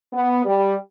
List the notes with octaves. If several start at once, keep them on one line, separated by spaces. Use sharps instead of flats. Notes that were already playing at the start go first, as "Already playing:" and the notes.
B3
G3